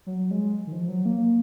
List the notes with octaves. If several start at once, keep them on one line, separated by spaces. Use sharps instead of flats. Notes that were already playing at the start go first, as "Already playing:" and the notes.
F#3
G#3
D#3
F3
F#3
A#3